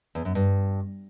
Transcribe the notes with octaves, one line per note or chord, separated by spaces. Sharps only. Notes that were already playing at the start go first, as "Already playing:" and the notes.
E2
F#2
G2